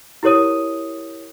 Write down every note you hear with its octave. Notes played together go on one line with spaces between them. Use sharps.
E4 G4 A#4 C#5 D#6 D#7